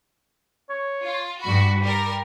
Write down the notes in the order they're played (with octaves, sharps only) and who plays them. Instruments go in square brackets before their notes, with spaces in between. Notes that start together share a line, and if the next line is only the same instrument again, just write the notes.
[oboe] C#5
[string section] F4
[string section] G2 F#4 [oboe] B5
[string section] G3 A#4